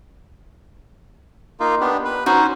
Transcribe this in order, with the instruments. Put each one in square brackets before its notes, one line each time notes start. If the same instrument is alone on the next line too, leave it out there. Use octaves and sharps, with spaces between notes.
[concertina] A#3 D#4 F4
B3 D4 G4
B4
[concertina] C#4 C5 [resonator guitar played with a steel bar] D#4 F#4